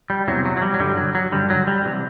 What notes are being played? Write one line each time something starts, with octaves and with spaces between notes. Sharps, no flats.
G3
E2 C3 E3 F#3
F#3
F#3
G3
F#3
G2 D3 G3
F#3
F#3
G2 D3 G3
F#3
G3
C3 E3